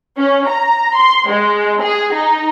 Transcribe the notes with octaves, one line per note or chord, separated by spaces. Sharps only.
C#4
A#5
C6
G#3
G#4
D#4